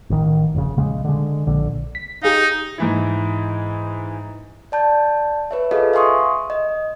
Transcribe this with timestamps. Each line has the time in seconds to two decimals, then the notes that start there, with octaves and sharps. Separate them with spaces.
0.10 A1 D#3
0.55 F1 C#3
0.78 A#1 C#3 G#3
1.05 D3 G#3
1.47 A#1 D3
1.95 B6
2.23 D#4 G4 G#4 F5
2.78 G#2 E3 E4
4.72 D5 A5 G6
5.51 B4 C#5 E5
5.71 F4 G#4 A4 B4 D#5 F5
5.94 E5 F5 G#5 C6 C#6 D#6
6.50 D#5